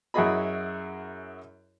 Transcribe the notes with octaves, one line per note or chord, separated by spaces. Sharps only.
F#2 E4 F#4 G#4 D#5 B5